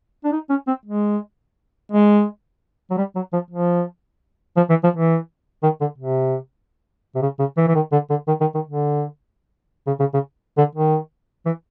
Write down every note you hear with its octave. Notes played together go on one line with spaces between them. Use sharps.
D4
D#4
C#4
C4
G#3
G#3
F#3
G3
F#3
F3
F3
F3
E3
F3
E3
D#3
D3
C3
C3
C#3
C#3
E3
E3
D#3
D3
D3
D#3
D#3
D#3
D3
C#3
C#3
C#3
D3
D#3
E3